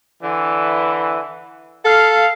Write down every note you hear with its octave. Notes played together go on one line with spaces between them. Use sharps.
D3 E3
A4 F5